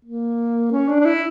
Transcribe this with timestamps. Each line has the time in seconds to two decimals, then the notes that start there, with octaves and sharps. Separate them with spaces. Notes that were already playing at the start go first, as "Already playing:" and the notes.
0.05 A#3
0.72 C#4
0.89 D4
1.00 D4
1.05 E4